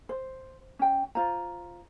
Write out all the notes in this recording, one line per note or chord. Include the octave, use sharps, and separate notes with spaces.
C5
C#4 G5
F4 C5 A#5